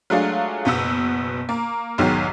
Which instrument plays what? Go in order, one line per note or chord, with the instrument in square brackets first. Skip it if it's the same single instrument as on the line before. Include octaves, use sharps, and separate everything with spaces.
[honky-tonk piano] F#3 G#3 A3 D4 F4 G#4
F#1 B2 B3 E6
A#3
B1 E2 G#2 D#3 F#3 G#3